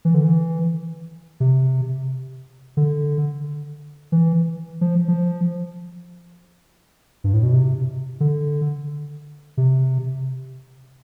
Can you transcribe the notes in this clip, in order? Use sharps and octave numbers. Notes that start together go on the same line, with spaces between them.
E3
D3
E3
C3
D3
E3
F3
F3
G2
A2
B2
C3
D3
C3